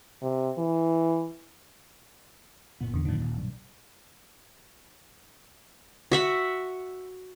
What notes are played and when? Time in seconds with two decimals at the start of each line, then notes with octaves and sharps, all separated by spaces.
0.23 C3
0.58 E3
2.81 F#1 A#2 B3
2.94 E2 D3
3.05 F#1 F#2 A#2 D3 D#3
3.18 D#1
3.37 B1 G2
6.12 F#4 E5 F#5